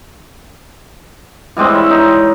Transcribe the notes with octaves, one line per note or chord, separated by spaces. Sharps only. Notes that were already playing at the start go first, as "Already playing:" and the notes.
E3 G3 G#3 C4
C#5 E5 B5
D#4